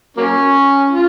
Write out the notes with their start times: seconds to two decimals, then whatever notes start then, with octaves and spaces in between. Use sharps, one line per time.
0.17 F#3 A#3 C#4
0.90 F4